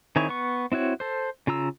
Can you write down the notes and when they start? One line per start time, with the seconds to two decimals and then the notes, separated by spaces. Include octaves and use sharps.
0.16 D#3 C4 E4 G#4 C#5
0.29 B3 C#6
0.72 C4 E4 F#4 C#5
1.00 A4 C5
1.47 C#3 F4 A#5 E6